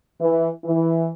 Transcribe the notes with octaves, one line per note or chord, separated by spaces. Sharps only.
E3
E3